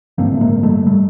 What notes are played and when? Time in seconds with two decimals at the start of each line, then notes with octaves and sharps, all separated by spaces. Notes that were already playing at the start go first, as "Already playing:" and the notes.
0.18 A1 G2 D3 A#3 C4
0.34 A3
0.41 G#3 A#3
0.63 G3 A3
0.86 G3 A3